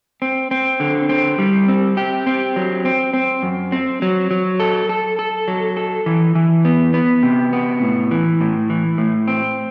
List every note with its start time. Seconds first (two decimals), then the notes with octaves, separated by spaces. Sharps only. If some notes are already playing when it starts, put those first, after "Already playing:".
0.22 C4
0.51 C4
0.80 D3
1.09 C4
1.39 G3
1.68 C4
1.97 G4
2.27 C4
2.56 F#3
2.85 C4
3.14 C4
3.43 F#2
3.72 C4
4.02 F#3
4.31 F#3
4.60 A4
4.89 A4
5.19 A4
5.48 F#3
5.77 A4
6.06 E3
6.35 E3
6.65 B3
6.94 B3
7.23 C3
7.53 B3
7.82 A2
8.11 E3
8.41 A2
8.70 E3
8.98 A2
9.28 C4